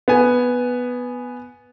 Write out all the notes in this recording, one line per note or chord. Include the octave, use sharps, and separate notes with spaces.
B3 G#5